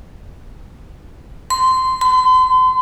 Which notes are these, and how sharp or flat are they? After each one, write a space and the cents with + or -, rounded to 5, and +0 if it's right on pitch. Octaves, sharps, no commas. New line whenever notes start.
C6 -15
C6 -45